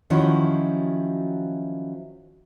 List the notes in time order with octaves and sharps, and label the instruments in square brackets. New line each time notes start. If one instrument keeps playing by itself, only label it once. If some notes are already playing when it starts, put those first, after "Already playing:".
[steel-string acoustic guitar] D#3 F3 F#3 C#4 E4 F#4